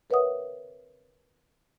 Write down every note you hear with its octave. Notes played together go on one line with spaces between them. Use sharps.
A#4 B4 C#5 E5 F#5 D#6